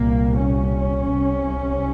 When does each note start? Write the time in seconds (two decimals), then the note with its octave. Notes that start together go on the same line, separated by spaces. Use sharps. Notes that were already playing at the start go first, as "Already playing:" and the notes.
Already playing: C2 A#2 A#3
0.40 C#4
1.12 C2 C3